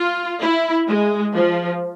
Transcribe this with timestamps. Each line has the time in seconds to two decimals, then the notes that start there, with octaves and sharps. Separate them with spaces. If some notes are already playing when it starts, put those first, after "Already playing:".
Already playing: F4
0.41 E4
0.88 G#3
1.35 F3